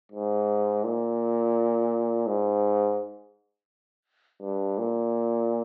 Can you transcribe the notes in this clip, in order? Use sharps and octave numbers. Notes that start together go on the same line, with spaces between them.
G#2
A#2
G#2
G2
A#2